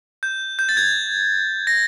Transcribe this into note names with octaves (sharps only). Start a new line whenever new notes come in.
G6
G6
A6
G#6
A#6